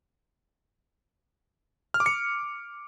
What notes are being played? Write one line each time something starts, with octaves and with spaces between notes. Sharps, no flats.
F6
D6
C#7